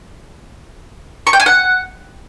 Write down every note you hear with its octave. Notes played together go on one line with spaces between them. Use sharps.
C#6
G5
G#5
F#5